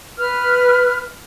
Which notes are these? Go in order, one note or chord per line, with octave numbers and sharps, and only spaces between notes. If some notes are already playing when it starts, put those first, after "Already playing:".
B4 F6